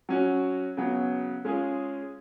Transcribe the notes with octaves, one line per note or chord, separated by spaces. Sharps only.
F#3 C#4 F#4
C#3 F#3 B3
G#3 C#4 F4 G#4